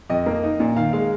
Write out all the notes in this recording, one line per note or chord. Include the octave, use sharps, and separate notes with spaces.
F2 D#5
A#3
D#4
A#2
D#3 F5
G#3 F5